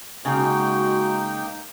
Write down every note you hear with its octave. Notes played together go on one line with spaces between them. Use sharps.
C#3 G#3 A#3 D#4 F#4 F5 G5